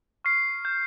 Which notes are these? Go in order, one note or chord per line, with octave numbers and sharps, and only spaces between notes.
C#6 F6 C7
G6